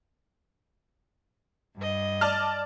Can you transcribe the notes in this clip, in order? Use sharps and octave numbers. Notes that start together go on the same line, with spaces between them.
G2 D#5
D5 A5 F6